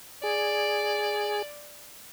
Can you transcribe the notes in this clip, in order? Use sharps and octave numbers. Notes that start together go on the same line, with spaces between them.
G#4 D5